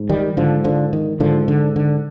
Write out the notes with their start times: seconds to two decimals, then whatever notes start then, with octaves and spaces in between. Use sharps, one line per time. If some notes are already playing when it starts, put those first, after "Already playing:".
Already playing: G#2
0.09 D#3 G3
0.37 G#2 D3 F3
0.64 D3 F3
0.93 D#3
1.20 G#2 D3 F3
1.48 D3
1.76 D3